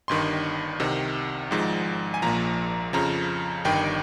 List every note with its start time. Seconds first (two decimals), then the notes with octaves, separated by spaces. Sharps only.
0.08 G1 G2 D#3 C6
0.80 C2 C3 D#3
1.51 G#1 G#2 F3
2.14 G#5
2.22 A#1 A#2 F3 A#5
2.93 F2 C#3 F3 A#5
3.65 G1 G2 D#3 G5